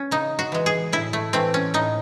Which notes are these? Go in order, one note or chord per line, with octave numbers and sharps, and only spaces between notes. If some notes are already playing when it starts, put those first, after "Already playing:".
Already playing: C#4
C#3 D#4
F#4
E3 G#3
G#4
A2 E4
A3
E3 A3 C4
C#4
A2 D#4